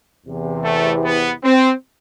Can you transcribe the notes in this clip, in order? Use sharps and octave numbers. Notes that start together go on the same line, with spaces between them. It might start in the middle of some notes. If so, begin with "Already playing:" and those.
E2 C3 E3
A3
B3
C4